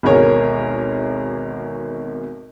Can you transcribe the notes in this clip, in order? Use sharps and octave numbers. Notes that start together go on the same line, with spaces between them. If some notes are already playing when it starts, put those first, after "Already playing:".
G#1 D2 B2 G#4 A#4 C#5